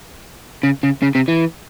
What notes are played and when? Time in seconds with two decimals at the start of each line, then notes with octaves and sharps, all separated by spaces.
0.63 C#3
0.83 C#3
1.02 C#3
1.15 C3
1.28 E3